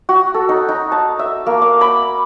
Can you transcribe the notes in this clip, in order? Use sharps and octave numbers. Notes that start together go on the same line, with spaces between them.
F#4
A4
D#4
D#4
A5
E5
A#3
D6
B5